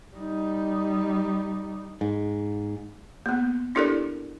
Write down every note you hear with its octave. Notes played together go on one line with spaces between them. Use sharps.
G3 D#4
G#2
A#3 B3
D4 E4 G4 A4 A#4 D5